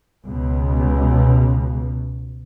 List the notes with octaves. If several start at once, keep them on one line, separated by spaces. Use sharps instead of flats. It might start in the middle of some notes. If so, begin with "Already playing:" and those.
C#2 B2